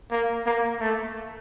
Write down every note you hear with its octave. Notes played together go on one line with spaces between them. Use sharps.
A#3
A#3
A3